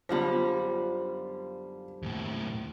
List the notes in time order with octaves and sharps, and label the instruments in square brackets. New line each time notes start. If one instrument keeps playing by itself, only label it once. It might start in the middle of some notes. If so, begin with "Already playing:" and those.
[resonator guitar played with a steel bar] F#2 D3 G3 [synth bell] B3 C5 [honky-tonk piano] F4
[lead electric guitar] D#2 A2